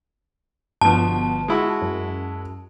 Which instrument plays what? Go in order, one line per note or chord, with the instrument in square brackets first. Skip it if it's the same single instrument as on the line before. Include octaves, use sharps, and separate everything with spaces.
[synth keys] G1 B3 [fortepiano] B2 F3 [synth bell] A5
[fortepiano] G#3 E4 F#4
[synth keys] F#2